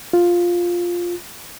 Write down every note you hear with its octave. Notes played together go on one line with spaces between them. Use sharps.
F4